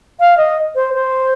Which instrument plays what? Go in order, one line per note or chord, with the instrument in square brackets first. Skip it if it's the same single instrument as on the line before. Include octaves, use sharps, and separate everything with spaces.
[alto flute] F5
D#5
C5
C5